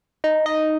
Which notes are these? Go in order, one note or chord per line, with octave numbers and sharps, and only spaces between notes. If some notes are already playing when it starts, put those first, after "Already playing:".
D#4
D#5